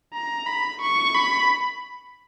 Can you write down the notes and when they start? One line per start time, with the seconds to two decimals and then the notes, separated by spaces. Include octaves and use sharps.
0.13 A#5
0.47 B5
0.82 C#6
1.15 B5